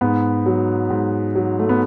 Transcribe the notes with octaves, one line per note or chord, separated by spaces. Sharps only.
G#2 B3
F#3
G#2
F#3
A3
B3